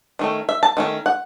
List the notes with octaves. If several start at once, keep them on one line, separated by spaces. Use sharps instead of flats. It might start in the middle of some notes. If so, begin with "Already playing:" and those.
D#3 A3 C#4
E5
A5
D#3 A3 C#4
F#5